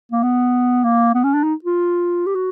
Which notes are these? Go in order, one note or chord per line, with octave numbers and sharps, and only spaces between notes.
A#3
B3
A#3
B3
C#4
D4
D#4
F4
G4
F#4